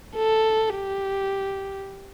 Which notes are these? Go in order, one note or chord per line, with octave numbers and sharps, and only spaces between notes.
A4
G4